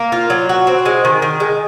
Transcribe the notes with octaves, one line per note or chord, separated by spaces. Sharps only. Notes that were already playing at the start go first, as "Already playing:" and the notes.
Already playing: A#3
F4
F#3
F#4
C4
G#3
D#3
D#3
G#3